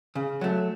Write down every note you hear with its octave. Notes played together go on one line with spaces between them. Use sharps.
C#3
F#3 A3